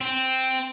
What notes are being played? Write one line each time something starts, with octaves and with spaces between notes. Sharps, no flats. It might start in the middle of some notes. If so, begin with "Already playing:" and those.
C4